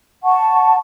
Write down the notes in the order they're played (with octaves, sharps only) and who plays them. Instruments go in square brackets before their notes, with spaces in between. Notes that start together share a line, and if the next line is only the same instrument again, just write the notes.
[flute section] F#5 A5 C#6